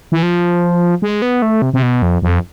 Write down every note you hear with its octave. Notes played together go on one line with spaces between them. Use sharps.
E3
F3
G#3
B3
A3
C3
C3
B2
F2
F2